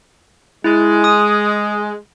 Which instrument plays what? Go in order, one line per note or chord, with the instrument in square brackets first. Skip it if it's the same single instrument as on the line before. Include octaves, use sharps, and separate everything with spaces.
[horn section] G#3 [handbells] E4
[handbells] D#6